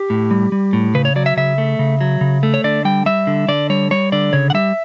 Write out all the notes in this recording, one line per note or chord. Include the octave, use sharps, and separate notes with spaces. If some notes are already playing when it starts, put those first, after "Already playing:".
Already playing: G4
A2
G3
G3
A2
C#3 B4
C#5
F#3 D5
E5
C#3 E5
A3
C#3
F#3
C#3
A3
C#5
D3 D5
G3 G5
G3 E5
D3
D3 D5
G3 C#5
G3 C#5
D3 D5
C#3 C#5
F#5
G3 E5